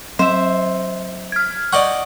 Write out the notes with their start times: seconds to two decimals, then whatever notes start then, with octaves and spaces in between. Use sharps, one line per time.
0.19 F#3 C5 E5
1.32 F6 G#6
1.73 D5 D#5 F#5 C#6